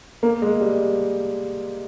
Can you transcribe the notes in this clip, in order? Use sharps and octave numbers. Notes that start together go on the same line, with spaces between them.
A#3
G#3
G3